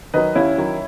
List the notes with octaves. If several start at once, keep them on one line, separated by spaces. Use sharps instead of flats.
D#3 F#3 B4 D#5
D#2 C#4 E4
D#3 F#3